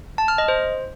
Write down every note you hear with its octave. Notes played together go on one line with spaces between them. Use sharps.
A5
F6
D#5
C5